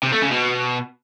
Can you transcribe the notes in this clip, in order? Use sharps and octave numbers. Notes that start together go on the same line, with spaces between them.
C3
A3
C#3
B2